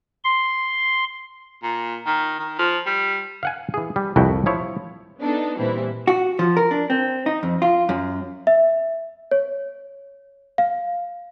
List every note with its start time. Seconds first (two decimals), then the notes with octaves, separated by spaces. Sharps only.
0.24 C6
1.63 A#2
2.06 D#3
2.39 D#3
2.59 F3
2.86 G3
3.43 F5 F#5 G#5
3.74 E3 G#4
3.96 G3
4.16 C2 F2 E4 F#4 F#5 G5
4.46 F3 E4 C#5
5.21 B3 D4 D#4 A4
5.59 A#2 E3 G3 C4 E4
6.07 F#4
6.39 F3
6.57 A#4
6.71 D4
6.90 C4
7.26 D#4
7.43 F2
7.62 F4
7.89 F#2
8.47 E5
9.31 C#5
10.58 F5